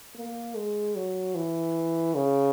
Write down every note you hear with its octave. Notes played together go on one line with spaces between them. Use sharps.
A#3
G#3
F#3
E3
C#3